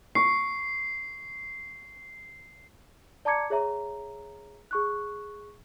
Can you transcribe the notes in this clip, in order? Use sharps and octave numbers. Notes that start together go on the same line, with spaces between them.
C#6 C7
D5 A5 A#5 D6 G#6 C#7
G#4 C#5 E5 A#5
G#4 C#6 F#6